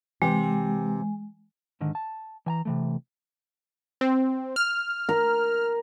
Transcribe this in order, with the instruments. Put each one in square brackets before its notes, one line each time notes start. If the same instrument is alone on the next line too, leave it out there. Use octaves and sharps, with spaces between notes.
[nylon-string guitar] C3 G4 [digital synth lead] E3 [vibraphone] G#3
[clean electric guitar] G#2 D3 D#3
A5
E3 G#5 A#5
C3 E3 A3
[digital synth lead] C4
F6
[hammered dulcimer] A#4